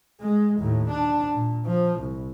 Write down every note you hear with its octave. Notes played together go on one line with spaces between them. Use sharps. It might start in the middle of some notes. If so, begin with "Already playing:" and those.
G#3
D#2 A2
D4
A#2
F3
C2